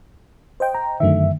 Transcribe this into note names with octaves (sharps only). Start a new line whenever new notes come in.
C5 D#5 G5
A#5
F#2 D3 D#3 A3 E5